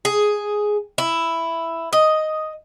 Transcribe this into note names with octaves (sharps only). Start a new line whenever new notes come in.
G#4
E4
D#5